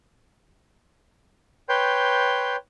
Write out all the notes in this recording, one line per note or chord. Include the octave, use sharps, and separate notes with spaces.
B4 C#5 G5 C6 G6